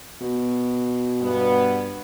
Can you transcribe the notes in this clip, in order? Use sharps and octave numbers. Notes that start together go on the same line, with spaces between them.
B2
G2 B3